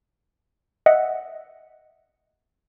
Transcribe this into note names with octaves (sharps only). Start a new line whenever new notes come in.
D#5 E5 F#5